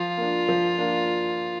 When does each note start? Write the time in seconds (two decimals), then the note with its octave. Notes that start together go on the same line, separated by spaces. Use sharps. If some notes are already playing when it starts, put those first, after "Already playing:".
Already playing: F3 F4
0.17 A#3 D4
0.48 F3
0.78 A#3 D4